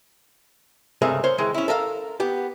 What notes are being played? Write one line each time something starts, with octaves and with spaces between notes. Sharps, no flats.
C#2 G2 C3 A3 G#4 A#4
A#4 C5 C#5
D#3 E3 G#3
C#4 E4
A4 A#4 E5 F5
B3 G4